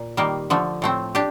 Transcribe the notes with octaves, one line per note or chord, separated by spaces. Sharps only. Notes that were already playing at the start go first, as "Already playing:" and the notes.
Already playing: A#2
D#3 G3 A#3
D3 F3 A3
A2 A3 C4
D4 G4